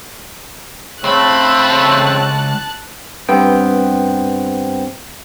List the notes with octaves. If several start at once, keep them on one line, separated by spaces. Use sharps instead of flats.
C#2 C#3 A3 C4 A5 B5 F#6
G2 B3 C4 C5 G5